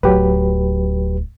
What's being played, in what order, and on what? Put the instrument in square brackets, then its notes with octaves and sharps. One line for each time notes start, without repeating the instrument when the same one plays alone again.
[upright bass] D1 [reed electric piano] F#3 G4 B4